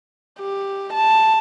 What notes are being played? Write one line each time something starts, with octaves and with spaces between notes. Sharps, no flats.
G4
A5